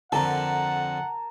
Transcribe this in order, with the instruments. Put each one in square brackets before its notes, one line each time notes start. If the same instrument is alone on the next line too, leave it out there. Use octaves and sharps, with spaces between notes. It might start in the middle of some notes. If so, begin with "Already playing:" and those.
[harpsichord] F2 D3 [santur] A#4 A5 [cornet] F#5